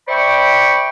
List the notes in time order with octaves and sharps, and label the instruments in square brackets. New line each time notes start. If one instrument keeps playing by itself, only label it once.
[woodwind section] C5 D5 E5 G5 B5 C#6